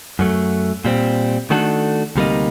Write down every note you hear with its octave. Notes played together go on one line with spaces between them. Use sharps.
F#2 F#3 A3
A#2 G3 C4
D#3 A3 D4 F#4 A4
D2 C3 G3 A#3 D#4